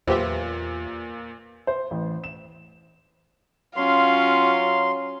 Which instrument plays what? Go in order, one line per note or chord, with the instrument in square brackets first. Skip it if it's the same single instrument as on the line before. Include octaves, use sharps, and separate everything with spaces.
[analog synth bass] E2 [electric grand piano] A#2 [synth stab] F#3 G4 E5 [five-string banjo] F4 B4 C5
[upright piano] C5
A1
E7
[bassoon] F#3 [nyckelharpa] C#4 F4 [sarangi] F5 [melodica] C6